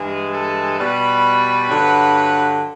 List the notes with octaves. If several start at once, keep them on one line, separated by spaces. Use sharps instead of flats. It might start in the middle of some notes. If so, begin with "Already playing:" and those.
Already playing: G2 E3 G#3 G#4
A4
B2 G3 B4
G2 D3 F#3